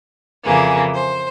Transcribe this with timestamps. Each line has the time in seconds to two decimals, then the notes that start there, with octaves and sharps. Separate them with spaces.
0.44 F2 C#3 E3 A#3 G#4
0.93 C5